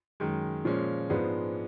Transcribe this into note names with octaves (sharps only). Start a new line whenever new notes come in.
F#2 D#3 G#3
A#2 F3 G#3 C#4
G#2 F3 G#3 B3 D4